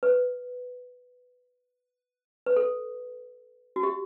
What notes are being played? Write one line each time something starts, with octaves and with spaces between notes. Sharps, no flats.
B4
B4
A4
F#4
G4